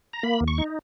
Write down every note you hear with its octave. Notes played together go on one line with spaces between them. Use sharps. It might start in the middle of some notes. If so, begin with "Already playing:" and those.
A#5
A#3 B5
D#2
C#6
D#4